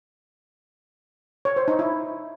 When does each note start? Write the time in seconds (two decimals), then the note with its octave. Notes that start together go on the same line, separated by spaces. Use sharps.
1.45 C#5
1.56 C5
1.68 D#4
1.79 E4